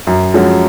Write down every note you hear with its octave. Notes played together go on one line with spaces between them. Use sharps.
F#2
F3 G#3 C#4 F#4